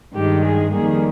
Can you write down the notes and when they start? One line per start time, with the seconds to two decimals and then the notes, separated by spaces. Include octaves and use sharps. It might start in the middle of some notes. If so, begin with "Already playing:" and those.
0.16 G2 D#3 G#3 G4
0.45 G#4
0.73 F2 D#3 G3 A#3 G#4